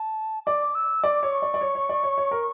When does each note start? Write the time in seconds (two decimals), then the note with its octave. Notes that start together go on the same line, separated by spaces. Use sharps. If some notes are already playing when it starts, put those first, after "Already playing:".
Already playing: A5
0.47 D5 D6
0.75 E6
1.03 D5 D6
1.23 C#5
1.32 C#6
1.42 D5
1.54 D5
1.61 C#5
1.75 C#5
1.89 D5
2.03 C#5
2.18 C#5
2.31 A#4